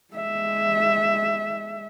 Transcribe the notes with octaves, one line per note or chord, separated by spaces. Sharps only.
G#3 E5